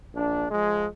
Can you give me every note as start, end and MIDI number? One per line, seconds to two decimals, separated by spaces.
0.14 0.44 34
0.14 0.44 62
0.50 0.85 53
0.50 0.85 56